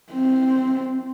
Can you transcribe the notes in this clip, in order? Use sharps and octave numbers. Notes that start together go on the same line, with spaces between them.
C4